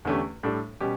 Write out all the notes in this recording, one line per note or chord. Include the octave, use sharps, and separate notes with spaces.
E2 D3 A3 C#4 G4
A2 G3 D4 A4
B2 G3 C#4 G4